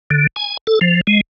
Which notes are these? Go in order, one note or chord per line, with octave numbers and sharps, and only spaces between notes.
D3
G#5
A4
F3
G#3